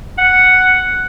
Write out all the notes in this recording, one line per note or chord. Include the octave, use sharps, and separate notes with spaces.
F#5